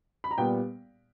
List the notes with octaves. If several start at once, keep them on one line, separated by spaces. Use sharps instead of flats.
B5
A#5
A#2 G3 B3 G5